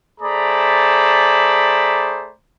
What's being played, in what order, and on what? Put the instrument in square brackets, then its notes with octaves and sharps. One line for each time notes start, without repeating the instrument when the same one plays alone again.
[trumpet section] A3 G#4 C5 D5 A#5 B5